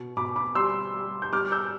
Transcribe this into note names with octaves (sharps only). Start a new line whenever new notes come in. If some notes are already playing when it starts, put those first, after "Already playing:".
Already playing: B2
B2 B5 D6
B5 D6
G3 C6 E6
G3
G6
G3 D6 F6
E6 G6